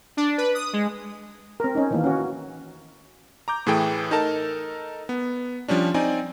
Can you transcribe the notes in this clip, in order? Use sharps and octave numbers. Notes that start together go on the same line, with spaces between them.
D4
B4
D#6
G#3
C4 A#4
C#4 D#4
D#3 E3 A#3
C#4 F#4
A#5 D6 G6
A2 E3 A3 G#4 A4 G5
D#4 A4 A#4 A5
B3
F3 G3 C#4 D4
C4 D#4 D5 G#5